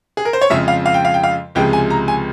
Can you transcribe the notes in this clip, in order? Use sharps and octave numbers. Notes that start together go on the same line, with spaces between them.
G#4
A#4
C5
C#5
F2 C#3 F3 G#3 E5
F5
F5
G5
F5
G5
F5
C#2 C3 F3 G#3 G5
G#5
A#5
G#5